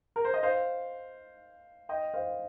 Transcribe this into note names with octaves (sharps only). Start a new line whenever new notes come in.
A#4
C5
D#5
C5 F5
D#5 G5
C5 F5